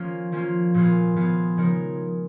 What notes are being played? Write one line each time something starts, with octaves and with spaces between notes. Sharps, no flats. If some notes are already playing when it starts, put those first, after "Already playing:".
Already playing: F3 A#3 C#4 F4
F3 A#3 C#4 F4
A#2 F3 B3 F4 G#4
A#2 F3 B3 F4 G#4
C#3 F3 G#3 D#4 A#4